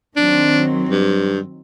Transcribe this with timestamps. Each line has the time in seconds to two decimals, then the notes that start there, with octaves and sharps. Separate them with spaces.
0.16 D#3 F#3 C4 D4
0.89 G2